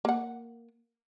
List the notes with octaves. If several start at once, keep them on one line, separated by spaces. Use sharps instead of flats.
A#3 F#5